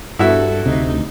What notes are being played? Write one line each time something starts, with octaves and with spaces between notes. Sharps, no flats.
G2 E4 F#4 A4 E5
D2 C3 D#4